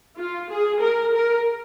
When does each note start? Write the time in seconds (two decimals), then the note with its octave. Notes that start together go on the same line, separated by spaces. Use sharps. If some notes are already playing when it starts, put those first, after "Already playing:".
0.17 F4
0.49 G#4
0.81 A#4
1.13 A#4